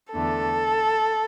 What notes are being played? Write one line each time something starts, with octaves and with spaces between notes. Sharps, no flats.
E2 D3 A3 A4